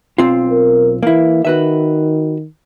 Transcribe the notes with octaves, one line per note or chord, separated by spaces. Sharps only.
B1 C4 F4
A#4
E3 A#3 E4
D#3 F#4 B4 E5